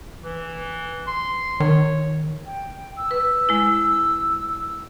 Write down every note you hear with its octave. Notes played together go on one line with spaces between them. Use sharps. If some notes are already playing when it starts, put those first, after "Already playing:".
E3
C6
D#3 C#5
G5
E6
B4
G#3 E4